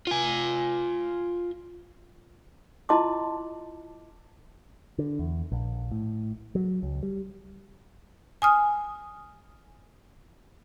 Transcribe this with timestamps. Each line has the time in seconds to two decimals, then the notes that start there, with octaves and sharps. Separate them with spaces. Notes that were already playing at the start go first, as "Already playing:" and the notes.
0.07 F4 G#5
2.89 E4 F4 D#5 A5 C6 D6
4.98 D3
5.19 E2
5.52 A#1
5.91 A2
6.55 F#3
6.83 C#2
7.03 G3
8.42 G#5 D#6 F6